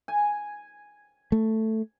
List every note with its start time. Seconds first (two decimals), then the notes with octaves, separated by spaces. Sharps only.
0.08 G#5
1.32 A3